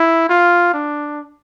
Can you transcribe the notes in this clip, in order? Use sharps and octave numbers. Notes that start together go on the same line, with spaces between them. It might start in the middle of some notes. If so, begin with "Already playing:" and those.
Already playing: E4
F4
D4